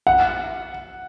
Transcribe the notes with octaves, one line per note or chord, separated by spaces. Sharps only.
F#5